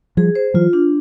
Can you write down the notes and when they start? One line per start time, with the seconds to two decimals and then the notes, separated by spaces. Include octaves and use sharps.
0.17 F3 G3 G#4
0.35 C5
0.54 E3 F#3 F4
0.73 D4